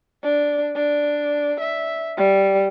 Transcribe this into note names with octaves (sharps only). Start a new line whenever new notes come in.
D4
D4
E5
G3